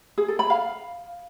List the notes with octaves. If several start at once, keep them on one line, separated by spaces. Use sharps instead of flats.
G#4
A4
B5
F5